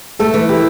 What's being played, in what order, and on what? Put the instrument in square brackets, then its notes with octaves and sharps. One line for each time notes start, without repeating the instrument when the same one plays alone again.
[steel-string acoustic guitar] A3 [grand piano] A4
[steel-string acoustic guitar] E3
[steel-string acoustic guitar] E4 [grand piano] G4